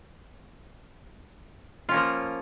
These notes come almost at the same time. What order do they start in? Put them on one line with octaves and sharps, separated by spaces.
F4 C#4 A#3 F3